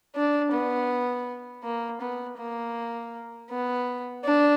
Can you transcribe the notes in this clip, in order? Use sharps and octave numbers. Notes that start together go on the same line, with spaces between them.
D4
B3
A#3
B3
A#3
B3
D4